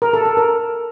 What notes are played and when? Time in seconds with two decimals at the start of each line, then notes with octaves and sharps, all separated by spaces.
0.02 A#4
0.13 A4
0.25 A4
0.37 A#4